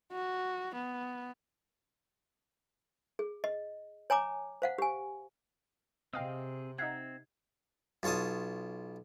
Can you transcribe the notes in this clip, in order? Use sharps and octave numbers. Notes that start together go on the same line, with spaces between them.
F#4
B3
G#4
D#5
C#5 G#5 A#5 D6
C5 F5 F#5
G4 G#5
C3 C4 G#4 D#5 F5 G5
C4 D#4 E5 F#5 G#6 C7
B1 F4 C#5 A5 D#6